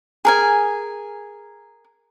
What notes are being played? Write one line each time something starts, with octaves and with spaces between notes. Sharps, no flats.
G#4 A#4 G#5